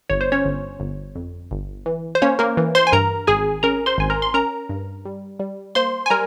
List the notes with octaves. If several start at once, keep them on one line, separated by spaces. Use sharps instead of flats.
G1 C#5
C5
C#4 C#5
G1
G1
F2
G1
E3
C5
A#3 C#4 C#5
A#3 A#4
E3
C5 C6
G#5
G2 A#4 A#5
G#1 G#4 G#5
C#4 A#4 A#5
C5 C6
G#1 G#5
A#4 A#5
C6
C#4 A#4 A#5
G2
G3
G3
A#3 C5 C6
G#5
G3 A#4 A#5